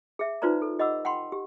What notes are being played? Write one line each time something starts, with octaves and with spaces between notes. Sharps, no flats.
G#4 E5
D#4 F4 B4 C5 D5 A#5
A4
G4 D#5 F#5 B5 D6 E6
F#5 G5 B5 C6
G4